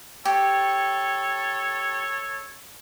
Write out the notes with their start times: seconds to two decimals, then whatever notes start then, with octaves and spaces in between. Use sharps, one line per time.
0.25 G4 A4 C#5